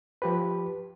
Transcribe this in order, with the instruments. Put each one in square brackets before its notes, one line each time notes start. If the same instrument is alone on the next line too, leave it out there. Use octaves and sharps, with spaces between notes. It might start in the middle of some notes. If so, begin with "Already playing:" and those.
[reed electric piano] F3 G4 B4